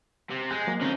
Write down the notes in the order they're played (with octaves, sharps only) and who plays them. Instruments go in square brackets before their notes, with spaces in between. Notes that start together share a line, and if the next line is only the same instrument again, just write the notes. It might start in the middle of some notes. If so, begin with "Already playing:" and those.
[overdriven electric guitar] C3
[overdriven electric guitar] G#3 [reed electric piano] G#5 F#6 G6
[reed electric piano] F#3 A#3
[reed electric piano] D3 C4 C#4 [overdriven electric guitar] F3 D#4